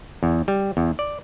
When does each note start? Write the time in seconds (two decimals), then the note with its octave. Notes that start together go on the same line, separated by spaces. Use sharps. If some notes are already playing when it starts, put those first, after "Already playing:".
0.23 E2
0.48 G3
0.77 E2
0.99 D5